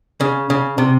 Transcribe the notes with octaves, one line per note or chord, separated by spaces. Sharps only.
C#3
C#3
C3